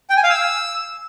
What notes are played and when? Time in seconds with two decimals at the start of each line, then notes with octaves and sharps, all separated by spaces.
0.10 G5
0.17 G#5
0.23 F5
0.30 E6